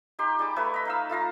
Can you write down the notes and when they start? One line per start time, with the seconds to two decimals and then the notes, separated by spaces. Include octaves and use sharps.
0.19 D#4 G4 C6
0.39 G3 G#4 D6
0.56 A3 B4 C#5 E5
0.74 D#5 B5
0.85 D#4 F5 E6
1.09 A3 F4 F5 A#5